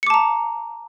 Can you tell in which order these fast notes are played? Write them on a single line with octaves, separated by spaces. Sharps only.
C#7 D6 A5 A#5